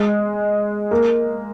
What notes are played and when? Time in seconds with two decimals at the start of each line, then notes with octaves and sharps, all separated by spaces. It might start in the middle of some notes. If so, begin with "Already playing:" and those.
Already playing: G#3
0.91 A#3